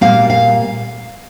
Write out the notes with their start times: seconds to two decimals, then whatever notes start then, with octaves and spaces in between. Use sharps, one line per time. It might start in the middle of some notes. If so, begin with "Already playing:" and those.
0.01 A#2 G3 A#3 F5
0.30 F5